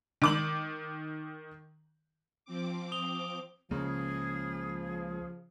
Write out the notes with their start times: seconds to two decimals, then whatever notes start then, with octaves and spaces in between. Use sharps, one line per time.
0.22 D#3 D6 F#7
2.45 F3 C4 D6
2.92 D#6 F7 G7
3.71 C#2 C#3 F3 A#3 G#4